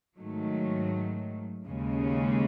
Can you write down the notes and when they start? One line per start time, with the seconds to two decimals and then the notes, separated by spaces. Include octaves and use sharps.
0.18 G#2 D#3 F#3 A3
1.66 D#2 C#3 G#3 C#4